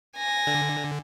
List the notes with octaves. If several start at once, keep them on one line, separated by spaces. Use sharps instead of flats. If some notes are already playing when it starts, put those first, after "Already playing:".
G#5 A#6
D3